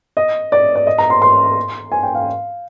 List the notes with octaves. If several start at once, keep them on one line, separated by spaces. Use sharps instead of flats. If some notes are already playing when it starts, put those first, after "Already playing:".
D#5
D5
D5
D#5
A#5
C6
C6
G#5
G5
F5